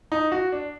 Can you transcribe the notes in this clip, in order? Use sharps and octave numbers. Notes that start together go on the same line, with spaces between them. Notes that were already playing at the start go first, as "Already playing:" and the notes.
D#4
F#4
D4